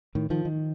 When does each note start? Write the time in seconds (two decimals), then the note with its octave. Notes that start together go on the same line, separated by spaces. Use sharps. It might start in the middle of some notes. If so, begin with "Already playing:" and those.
0.15 A2 D#3
0.30 D#3 F3
0.45 D#3